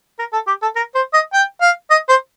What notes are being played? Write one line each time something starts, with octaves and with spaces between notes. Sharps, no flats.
A#4
A4
G4
A4
A#4
C5
D#5
G5
F5
D#5
C5